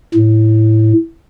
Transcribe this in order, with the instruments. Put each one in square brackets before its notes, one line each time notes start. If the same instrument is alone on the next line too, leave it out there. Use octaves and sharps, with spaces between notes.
[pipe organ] A2